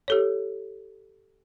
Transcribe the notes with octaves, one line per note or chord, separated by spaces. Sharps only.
G4 A4 C#5